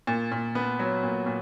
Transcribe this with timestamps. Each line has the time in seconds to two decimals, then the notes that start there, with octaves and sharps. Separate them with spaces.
0.07 A#2
0.32 A#2
0.55 B3
0.79 F#3
1.03 A#2
1.26 A#2